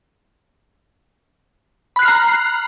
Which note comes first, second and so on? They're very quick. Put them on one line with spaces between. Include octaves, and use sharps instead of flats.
B5 F#6 C7 F6 A#5